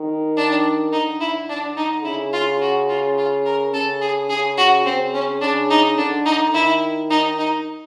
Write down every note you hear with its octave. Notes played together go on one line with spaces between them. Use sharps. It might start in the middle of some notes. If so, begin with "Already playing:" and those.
Already playing: D#3
D4
D3 D#4
E4
D4
D#4
C#3 E4
F4
F#4
F4
F4
A#4
C#3 A4
G#4
C#3 G#4
F#4
C#3 C4
C#4
C#3 D4
D#4
D3 D4
D#4
D#3 E4
D#4
D#4